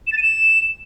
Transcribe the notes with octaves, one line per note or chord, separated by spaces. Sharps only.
E7
A6
D#7
E7